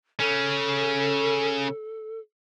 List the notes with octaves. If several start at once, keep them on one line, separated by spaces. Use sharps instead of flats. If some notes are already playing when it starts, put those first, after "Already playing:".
C#3 C#4 A4